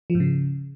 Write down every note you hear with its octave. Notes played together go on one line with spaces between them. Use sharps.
F3
G#2
C#3